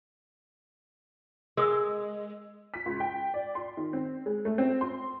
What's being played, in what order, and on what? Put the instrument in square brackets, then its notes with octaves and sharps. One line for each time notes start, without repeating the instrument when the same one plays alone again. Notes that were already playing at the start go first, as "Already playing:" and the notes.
[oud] G#3 [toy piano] A#4 D#6 E6
[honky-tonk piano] B6
C#2
G5
D5
C6
D#3
C4
G#3
A3
C4
C6